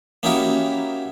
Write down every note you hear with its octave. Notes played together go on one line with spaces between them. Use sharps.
A#3 C#4 D#4 E4 F#4 G4